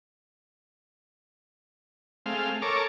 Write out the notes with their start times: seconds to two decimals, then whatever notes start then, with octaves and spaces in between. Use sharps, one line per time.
2.26 G#3 A3 C4 F5
2.62 A4 A#4 C#5 D6